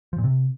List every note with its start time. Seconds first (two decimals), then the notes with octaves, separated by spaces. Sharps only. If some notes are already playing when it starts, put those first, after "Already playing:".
0.13 F3
0.18 A#2
0.24 C3